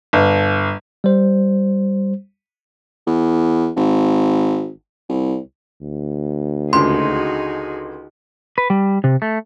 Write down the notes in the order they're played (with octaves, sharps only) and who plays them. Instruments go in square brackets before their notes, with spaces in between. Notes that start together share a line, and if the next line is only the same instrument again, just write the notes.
[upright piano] G1
[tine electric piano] G3 C5
[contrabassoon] E2
G#1
C2
[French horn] D2
[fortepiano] C#2 D3 [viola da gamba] D#4 F#4 G#4 [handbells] C6
[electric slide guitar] B4
G3
C3
A3